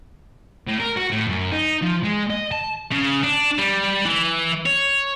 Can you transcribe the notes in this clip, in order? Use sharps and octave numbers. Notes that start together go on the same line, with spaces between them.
A2
A#4
F#4
A2
F#2
D#4
F3
G#3
D#5
A5
C#3
D4
G3
E3
C#5